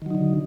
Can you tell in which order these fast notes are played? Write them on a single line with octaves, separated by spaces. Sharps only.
D#3 F#3 D#4 D3